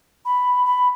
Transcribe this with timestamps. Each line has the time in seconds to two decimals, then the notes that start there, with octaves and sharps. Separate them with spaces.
0.25 B5
0.65 B5